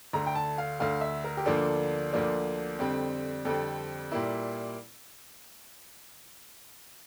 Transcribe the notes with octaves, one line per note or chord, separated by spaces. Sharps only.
D2 D3 A3 A#5
G5
A5
F5
D2 D3 A3 F5
E5
A#4
G4
D2 D3 F3 A#3 D4 A4
D2 D3 F3 A#3 D4
F2 D3 G3 C4
F2 D3 G3 C4 A4
A#2 G3 A#3 E4